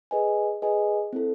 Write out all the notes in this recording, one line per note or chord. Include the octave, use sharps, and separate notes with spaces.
G#4 B4 D#5 G#5
G#4 B4 D#5 G#5
C4 E4 A4